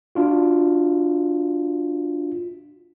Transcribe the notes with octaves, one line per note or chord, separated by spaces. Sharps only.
D4 F4 F#4